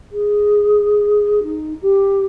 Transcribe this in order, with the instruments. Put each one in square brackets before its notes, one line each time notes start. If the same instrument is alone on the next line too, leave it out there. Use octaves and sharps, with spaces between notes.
[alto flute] G#4
D#4
G4